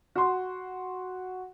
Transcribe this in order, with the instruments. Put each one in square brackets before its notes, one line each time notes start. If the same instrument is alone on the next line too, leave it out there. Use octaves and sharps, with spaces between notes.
[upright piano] F#4 C6